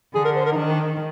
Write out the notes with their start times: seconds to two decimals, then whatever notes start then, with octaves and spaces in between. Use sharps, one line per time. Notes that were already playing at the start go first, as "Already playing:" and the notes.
0.14 D3 G#4
0.25 A#4
0.36 C5
0.46 A#4
0.52 D#4
0.56 D#3 D4